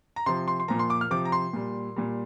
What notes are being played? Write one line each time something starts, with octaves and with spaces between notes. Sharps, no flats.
A#5
C3 F3 C6
C6
C6
A#2 F3 A#5
C6
D6
F6
C3 F3 D6
A#5
C6
A#2 G3
A#2 G3